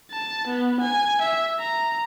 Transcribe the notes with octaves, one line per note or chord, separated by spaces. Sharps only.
A5
B3
G#5
E5
A#5